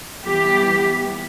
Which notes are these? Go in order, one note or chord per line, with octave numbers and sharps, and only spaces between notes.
E3 G3 B3 G4